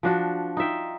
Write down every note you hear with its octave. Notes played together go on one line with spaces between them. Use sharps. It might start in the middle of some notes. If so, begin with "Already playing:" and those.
F3 D4 F#4
D#4 F4 E5 G5